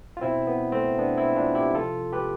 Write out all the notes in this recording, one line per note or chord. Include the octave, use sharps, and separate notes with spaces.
F4
B2 C4 E4
B3
A3 C4
B2 B3 D4
C4 E4
D4 F4
E4 G4
C3 F3 F4 A4
G4 B4